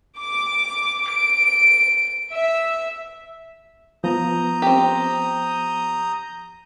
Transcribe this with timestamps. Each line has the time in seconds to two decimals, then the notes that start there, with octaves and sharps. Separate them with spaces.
0.19 D6
1.10 D7
2.33 E5
4.04 F3 B3 A#5 D#6 G6
4.62 C4 G4